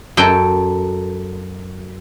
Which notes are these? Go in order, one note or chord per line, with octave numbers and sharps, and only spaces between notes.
F#2 A4 G5